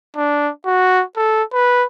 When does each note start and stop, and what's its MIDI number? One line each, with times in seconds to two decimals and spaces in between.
0.17 0.51 62
0.65 1.03 66
1.17 1.43 69
1.53 1.85 71